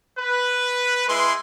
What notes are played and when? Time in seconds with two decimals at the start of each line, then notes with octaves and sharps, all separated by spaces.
0.18 B4
1.09 G#3 E4 C6